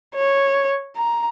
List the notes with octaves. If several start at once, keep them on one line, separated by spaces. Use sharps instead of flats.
C#5
A#5